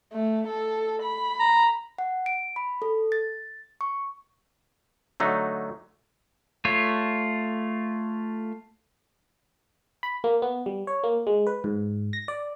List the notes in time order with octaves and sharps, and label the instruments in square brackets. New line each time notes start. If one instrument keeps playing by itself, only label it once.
[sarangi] A3
A4
B5
[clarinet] A#5
[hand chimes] F#5
D7
B5
A4
A6
C#6
[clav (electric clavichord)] D3 F#3 A3 D#4
[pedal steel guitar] A3 F4 C#5
[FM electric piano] B5
A#3
B3
G3
C#5
A#3
G#3
B4
G#2
A#6
D5